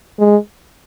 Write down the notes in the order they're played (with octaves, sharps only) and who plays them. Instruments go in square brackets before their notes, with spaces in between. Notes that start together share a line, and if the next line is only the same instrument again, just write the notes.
[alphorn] G#3